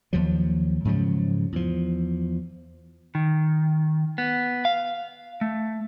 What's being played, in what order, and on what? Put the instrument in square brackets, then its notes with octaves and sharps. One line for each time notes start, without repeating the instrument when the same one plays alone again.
[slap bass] D#2 F3 F#3
G#2 C#3 F3 F#3
E2 F3
[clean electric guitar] D#3
B3
F5
A3